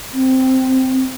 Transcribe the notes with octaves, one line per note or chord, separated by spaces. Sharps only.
C4